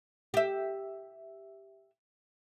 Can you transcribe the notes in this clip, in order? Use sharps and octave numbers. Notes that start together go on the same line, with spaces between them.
G4 E5